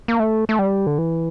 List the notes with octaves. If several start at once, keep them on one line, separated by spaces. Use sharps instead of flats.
A#3
A3
A3
G3
D3
E3